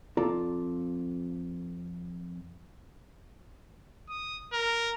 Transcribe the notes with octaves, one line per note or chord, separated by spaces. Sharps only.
F2 F4 A4 D5 A#5
D#6
A#4